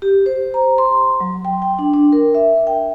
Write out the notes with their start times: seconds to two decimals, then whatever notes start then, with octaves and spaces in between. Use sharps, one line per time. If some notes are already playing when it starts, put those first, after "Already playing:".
0.02 G4
0.26 C5
0.54 A#5
0.78 C6
1.20 F#3
1.45 G5
1.62 G5
1.79 D4
1.93 D4
2.13 A#4
2.35 E5
2.67 G5